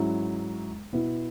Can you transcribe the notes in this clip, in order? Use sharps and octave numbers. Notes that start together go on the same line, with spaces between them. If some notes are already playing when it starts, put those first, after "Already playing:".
Already playing: G#2 F#3 C#4 E4
B2 B3 E4